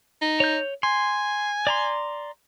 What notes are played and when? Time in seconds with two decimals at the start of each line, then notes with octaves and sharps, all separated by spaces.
0.22 D#4
0.40 C#5 G6
0.83 G#5 C6
1.67 D5 A#5 C6